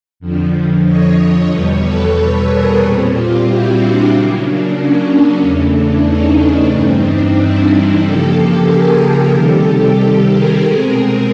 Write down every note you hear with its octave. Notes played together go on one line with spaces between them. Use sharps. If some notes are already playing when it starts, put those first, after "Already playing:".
F2 D3 F3
C#5 D#5
E2 B2 G3 B4 C#5
A4 B4
G#4 A#4
A#2 G3 C4 G4 A4
F4 G4
E4 F#4
D4
C#3 F#3 A#3
D4
C#4
D4
E2 C#3 E3 A3 C#4
D4
C#4 D#4
D4
G2 E3 G3 C4 C#4 D#4
D4
D4 E4
C#3 F3 A#3 G4 A4
G#4 A#4
C3 D#3 G3 G4 A4
G#4 A#4
B2 G#3 C4 G#4 A#4